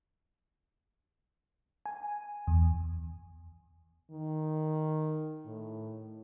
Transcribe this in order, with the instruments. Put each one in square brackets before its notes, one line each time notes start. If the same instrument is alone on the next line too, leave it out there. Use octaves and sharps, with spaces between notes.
[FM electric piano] G#5
E2
[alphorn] D#3
A2